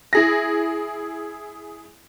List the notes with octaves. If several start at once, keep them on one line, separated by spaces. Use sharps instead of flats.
E4 G#4 A#6